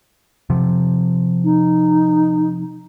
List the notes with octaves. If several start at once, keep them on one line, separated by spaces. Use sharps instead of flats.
C3 F3
D#4